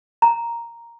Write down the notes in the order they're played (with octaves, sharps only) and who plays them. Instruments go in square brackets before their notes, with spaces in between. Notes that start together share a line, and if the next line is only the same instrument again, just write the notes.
[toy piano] A#5